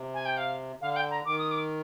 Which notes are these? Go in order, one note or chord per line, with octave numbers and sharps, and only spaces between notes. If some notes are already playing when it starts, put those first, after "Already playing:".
Already playing: C3
G#5
G5
F5
D3 F5
F5
G5
A#5
D#3 D6
D#6
D6